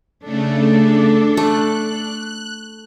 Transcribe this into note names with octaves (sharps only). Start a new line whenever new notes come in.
C#3 A3 D4 A4
A3 F#6